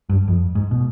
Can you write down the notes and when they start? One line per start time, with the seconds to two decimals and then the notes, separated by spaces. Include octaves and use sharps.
0.09 G2
0.28 F2
0.55 G#2
0.71 B2